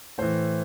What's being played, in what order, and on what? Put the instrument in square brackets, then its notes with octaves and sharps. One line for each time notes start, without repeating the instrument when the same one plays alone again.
[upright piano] A2 E3 C5